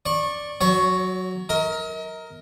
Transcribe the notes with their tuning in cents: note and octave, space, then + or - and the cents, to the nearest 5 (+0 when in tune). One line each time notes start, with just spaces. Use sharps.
D5 +0 C#6 -25
F#3 +0 C#5 +40 C#6 +0
A#4 +0 D#5 +40